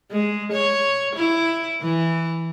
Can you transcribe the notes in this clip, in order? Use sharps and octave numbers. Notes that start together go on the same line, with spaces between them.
G#3
C#5
E4
E3